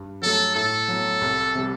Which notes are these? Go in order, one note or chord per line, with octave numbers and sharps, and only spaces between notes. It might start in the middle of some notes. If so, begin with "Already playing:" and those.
Already playing: G2
F#3 A3 A4
A2 A4
F#3 B3
C2
C3 G3